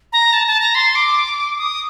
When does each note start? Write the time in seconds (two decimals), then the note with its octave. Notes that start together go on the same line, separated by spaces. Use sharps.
0.13 A#5
0.33 A5
0.47 A5
0.61 A#5
0.75 C6
0.95 D6
1.58 D#6